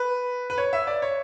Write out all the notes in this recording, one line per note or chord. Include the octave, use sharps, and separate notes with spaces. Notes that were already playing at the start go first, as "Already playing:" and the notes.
Already playing: B4
B4
C#5
E5
D5
C#5